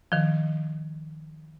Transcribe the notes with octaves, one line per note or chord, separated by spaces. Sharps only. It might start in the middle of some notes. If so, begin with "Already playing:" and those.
D#3 F3